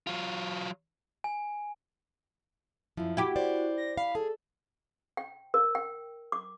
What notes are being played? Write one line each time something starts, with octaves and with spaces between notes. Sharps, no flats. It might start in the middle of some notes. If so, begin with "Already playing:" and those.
F#3 F4
G#5
F#2 F3 E4
E4 F#4 G4
C5 D5
A#6
F5 B5
G#4 A4
G5
A#4
G5
D6